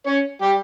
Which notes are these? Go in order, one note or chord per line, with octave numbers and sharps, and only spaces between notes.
C#4 C#5
G3 G4